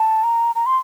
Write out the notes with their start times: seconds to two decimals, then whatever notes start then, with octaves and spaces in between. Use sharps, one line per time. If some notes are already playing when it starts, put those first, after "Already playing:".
Already playing: A5
0.24 A#5
0.55 A#5
0.66 C6